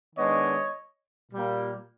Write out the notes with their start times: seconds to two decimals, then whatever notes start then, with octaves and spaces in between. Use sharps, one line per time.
0.16 D#3 G#3 B3 D4 C#5 D#5
1.32 A#2 G3 A#3